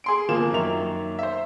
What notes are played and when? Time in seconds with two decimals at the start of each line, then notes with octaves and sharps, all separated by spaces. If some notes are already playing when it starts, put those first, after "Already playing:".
0.04 G#4 C6 D7
0.29 G1 F3 A#3 C4 E7
0.52 F#2 D#3 A#3 E5 F7
1.19 C5 E5